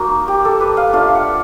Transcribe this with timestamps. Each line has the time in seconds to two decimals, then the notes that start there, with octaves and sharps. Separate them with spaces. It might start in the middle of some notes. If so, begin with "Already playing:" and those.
Already playing: A#3 D#4 F#4
0.28 G4
0.45 A4
0.61 B4
0.77 F5
0.93 A3 D4 F4 F5
1.15 F#5